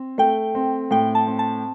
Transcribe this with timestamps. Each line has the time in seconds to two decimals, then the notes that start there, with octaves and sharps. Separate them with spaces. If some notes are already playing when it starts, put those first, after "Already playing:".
Already playing: C4
0.18 A3 G5
0.55 C4
0.91 A2 G5
1.15 A5
1.27 C4
1.39 A5